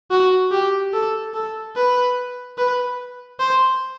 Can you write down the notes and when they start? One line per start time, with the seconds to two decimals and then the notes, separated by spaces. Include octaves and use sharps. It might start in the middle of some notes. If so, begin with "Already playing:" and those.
0.11 F#4
0.51 G4
0.93 A4
1.34 A4
1.76 B4
2.58 B4
3.40 C5